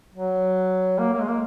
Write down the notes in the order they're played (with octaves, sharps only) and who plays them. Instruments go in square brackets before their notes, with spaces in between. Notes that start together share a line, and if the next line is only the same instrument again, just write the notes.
[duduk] F#3
A#3
A#3
G#3
A#3